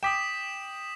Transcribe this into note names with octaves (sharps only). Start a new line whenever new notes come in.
G5 D6 D#6 B6 E7